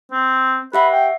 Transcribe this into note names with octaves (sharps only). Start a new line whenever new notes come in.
C4
G4 B4 E5 F#5
G5